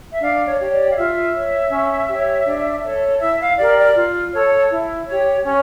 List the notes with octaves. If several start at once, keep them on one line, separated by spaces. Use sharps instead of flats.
E5
D4 F5
C#5
G4 C#5
D5
F5
F4 E5
C#5
C#4
G4 C#5
D4
A4 C#5
E4 E5
F5
G4 A#4 D5
D5
F4
A4 C#5
E4
G4 C#5
C#4 C#5